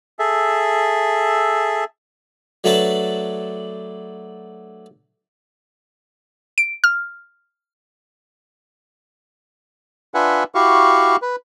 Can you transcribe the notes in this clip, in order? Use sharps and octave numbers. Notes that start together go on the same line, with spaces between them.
G#4 A4 E5
F#3 A3 D4 B4 A5
D7
F6
D4 F4 B4 E5 F#5 G#5
E4 F#4 G4 F5 C#6
B4